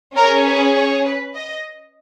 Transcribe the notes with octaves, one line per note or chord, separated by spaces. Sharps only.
C#4 G#4 A#4
B4
C#5
B4
D#5